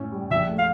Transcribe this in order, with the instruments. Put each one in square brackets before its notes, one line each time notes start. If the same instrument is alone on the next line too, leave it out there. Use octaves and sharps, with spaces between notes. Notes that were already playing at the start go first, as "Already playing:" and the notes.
Already playing: [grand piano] A2 C#4
G3
[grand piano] A#1 [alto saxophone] E5
[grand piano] A3
[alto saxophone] F5